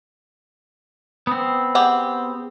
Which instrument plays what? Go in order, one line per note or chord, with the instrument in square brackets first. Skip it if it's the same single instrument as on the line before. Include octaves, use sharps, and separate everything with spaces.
[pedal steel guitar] B3 C4
[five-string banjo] G4 G#4 F#5